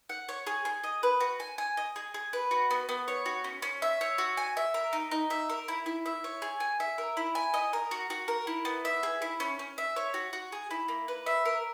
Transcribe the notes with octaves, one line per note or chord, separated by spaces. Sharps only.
F#5
C#5
G#4
G#4
D#5
B4
F#4
G#5
G#5
D#5
G#4
G#4
B4
F#4
B3
B3
C#5
F#4
C#4
C#4
E5
C#5
F#4
G#5
E5
A#4
D#4
D#4
E5
A#4
E4
E4
E5
C#5
G#4
G#5
E5
A#4
E4
G#5
D#5
A#4
F#4
F#4
A#4
E4
B3
E5
G#4
E4
C#4
C#4
E5
C#5
F#4
F#4
G#4
E4
A#3
B4
E5
A#4